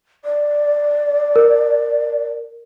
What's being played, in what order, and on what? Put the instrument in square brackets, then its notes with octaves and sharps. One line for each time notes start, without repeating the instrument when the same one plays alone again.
[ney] D5
[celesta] A#4